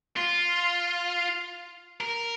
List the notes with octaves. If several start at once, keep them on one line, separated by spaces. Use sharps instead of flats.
F4
A#4